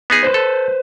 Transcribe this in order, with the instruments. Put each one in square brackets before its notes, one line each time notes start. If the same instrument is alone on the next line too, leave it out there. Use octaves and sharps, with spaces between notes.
[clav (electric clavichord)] B3 D#4 G#4
[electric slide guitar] B4 C5
[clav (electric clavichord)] A4